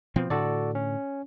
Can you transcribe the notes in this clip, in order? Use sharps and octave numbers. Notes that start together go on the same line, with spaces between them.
B2 F3 C4
A2 D3 F#4 A4 D5
C#4